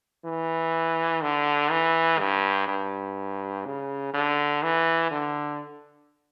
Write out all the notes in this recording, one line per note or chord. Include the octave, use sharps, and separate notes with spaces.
E3
D3
E3
G2
G2
C#3
D3
E3
D3